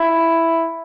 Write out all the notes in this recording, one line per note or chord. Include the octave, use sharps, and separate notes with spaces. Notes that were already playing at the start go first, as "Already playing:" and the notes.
Already playing: E4